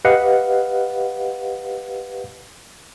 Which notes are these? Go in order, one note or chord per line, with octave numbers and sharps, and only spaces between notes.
G4 B4 D#5 F5 F#5